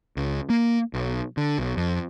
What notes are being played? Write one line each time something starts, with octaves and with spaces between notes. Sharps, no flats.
C#2
A#3
B1
D3
B1
F2